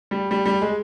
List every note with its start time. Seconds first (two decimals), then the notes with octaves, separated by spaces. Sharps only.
0.11 G3
0.31 G3
0.46 G3
0.61 G#3